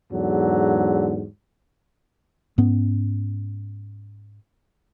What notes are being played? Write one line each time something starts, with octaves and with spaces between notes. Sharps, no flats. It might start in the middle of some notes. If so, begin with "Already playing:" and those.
E2 G#2 D3 F#3
G#2 B3 C#4